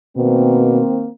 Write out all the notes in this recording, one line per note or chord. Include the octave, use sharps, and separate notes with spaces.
B2 D#3 A#3 C4